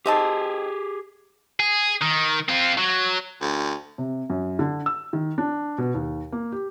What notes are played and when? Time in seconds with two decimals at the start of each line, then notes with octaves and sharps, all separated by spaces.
0.06 C4 D#4 G4 G#4 A5
1.60 G#4
2.02 D#3
2.49 C4 F4
2.78 F#3
3.41 D2
3.98 C3
4.30 F#2
4.59 D3
4.86 E6
5.13 D#3
5.38 D4
5.78 B2
5.95 D#2
6.32 A#3
6.52 G4